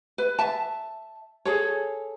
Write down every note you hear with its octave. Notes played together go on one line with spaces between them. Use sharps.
B4
E5 A5
G#4 A4 C#5